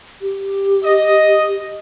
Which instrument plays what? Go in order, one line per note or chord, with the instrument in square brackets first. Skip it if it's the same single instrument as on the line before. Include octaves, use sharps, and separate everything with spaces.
[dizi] G4
[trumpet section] D#5